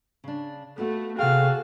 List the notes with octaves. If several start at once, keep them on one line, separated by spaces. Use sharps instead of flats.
C#3 D4
A3 B3 F4 F#4
C3 A#3 F#4 G#4 A4 F5 G5